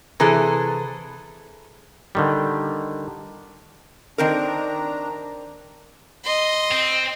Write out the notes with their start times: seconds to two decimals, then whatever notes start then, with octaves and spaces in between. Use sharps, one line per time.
0.20 C3 E3 G#4 A4
2.15 D3 D#3 G3
4.18 D#3 C4 D4 A#4 A#5
6.24 D#5 C6
6.71 C4